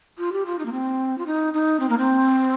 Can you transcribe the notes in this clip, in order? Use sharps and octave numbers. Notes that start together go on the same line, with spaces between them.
F4
G4
F4
D#4
A#3
C4
F4
D#4
D#4
C4
A#3
C4